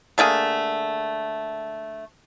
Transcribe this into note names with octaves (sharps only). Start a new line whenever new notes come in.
D3 A3 A#3 G#4